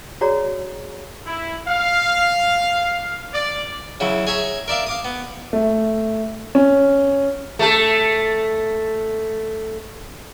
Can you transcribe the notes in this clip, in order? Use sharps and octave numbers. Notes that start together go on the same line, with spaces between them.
F#4 G#4 C#5 D5 A#5
E4
F5
D5
C#3 F#3 E4
G#4 C#5 E5 A#5
A#4 D5 E5 F5
F5 D6 D#6
B3
A3
C#4
A3 A4